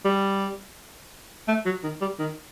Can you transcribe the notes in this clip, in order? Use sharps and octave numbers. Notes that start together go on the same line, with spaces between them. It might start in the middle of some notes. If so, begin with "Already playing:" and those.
G3
A3
F#3
D#3
G3
D#3